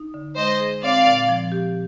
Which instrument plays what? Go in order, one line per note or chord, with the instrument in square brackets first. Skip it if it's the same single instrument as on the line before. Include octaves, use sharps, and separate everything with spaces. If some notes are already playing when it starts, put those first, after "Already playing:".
Already playing: [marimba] D#4
D3
[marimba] G#3 [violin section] C5 D#5
[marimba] G#4
[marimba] C4 [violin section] D5 F5
[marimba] A#2
F3
G4